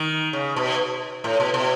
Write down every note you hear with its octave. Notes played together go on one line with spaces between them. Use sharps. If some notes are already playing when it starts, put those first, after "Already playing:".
Already playing: D#3
C#3
B2
A2
B2
B2